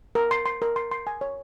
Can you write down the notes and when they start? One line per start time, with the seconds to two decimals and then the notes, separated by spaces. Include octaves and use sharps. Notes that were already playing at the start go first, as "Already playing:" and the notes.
0.15 A#4
0.31 C6
0.46 C6
0.62 A#4
0.76 C6
0.91 C6
1.07 G#5
1.21 C#5